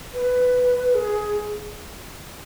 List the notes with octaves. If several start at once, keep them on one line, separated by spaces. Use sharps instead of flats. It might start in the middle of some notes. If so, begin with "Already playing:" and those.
B4
G#4